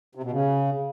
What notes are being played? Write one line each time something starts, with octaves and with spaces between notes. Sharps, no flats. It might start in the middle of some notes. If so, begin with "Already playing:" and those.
C3
B2
C#3